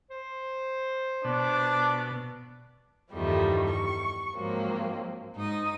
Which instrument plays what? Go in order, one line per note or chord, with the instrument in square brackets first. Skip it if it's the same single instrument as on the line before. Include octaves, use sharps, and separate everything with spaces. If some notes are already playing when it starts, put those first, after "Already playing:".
[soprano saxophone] C5
[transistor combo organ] B2 [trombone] D4 [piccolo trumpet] D6
[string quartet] E2 G2 D#3 F3 G3 A3
C#6
G#2 F3 F#3 A#3 C4
G#2 D#4 D#6